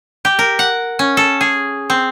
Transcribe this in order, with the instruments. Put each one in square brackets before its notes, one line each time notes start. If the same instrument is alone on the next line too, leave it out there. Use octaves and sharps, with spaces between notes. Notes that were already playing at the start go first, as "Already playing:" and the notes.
[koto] G4
A#4
F#5
C#4
A4
G#4
C4